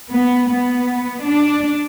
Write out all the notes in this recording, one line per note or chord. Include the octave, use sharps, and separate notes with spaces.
B3
B3
D4